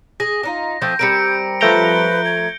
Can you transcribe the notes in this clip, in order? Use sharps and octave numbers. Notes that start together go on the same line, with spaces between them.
G#4 A#6
D4 D#4 F4
F3 A3 C4 G6
G3 C4 A#4 C#7 D7
F3 A3 B4 A#5 G6 D7 G7
G#6